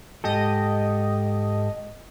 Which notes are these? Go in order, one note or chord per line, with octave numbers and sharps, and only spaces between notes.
G#2 G4 A4 D#5